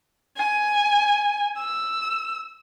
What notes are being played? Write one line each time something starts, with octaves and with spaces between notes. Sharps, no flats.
G#5
E6